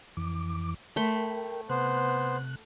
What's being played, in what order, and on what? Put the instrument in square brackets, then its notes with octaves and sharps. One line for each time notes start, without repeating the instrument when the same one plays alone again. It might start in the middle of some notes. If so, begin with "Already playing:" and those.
[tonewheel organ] F2 E3 D6
[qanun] A3 B5 C6 [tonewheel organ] A#4 G5
[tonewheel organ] C3 F#6 [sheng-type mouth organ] B3 C5